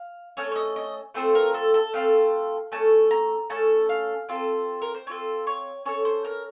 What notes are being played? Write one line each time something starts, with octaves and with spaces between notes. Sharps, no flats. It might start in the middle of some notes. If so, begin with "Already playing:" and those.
Already playing: F5
A3 C#4 A4 C#5
C#5
D#5
D#5
A3 C4 F4 A4 C5
A#4
A4
A4
A3 C4 F4 A4 F5
A3 C#4 A4 A5
A#5
A3 C#4 A4 A5
F5
C4 F4 A4
A#4
C5
C4 F4 A4 C#5
C#5
C#4 A4 C#5
C5
A#4